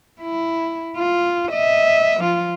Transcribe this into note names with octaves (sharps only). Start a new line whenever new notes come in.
E4
F4
D#5 E5
F3 F4